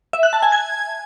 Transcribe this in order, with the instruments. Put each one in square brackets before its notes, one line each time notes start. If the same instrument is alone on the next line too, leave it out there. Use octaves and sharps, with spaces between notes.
[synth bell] E5
F#6
A5
G#5
G#6